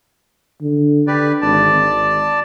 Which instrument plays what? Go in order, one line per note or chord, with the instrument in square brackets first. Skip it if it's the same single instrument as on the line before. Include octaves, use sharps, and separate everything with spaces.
[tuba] D3
[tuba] D3 [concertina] G4 B4 D5
[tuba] G#1 [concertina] D5 A5
[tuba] G#1